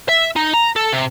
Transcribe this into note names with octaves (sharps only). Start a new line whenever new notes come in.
E5
D#4
A#5
A4
C3